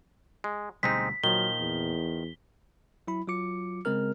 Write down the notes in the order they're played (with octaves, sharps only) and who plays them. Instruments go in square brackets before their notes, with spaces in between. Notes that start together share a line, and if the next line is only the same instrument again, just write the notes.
[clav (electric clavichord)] G#3
[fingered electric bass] D2 B2 G3 [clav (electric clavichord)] G#3 C4 D#4 [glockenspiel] B6
[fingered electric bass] A#2 [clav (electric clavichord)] D#3 F3 [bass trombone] F#3 [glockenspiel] G7
[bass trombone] E2
[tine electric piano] F#3 E4 B5
F#3 F4 D6 C#7
C#3 G#3 C4 A#4 F6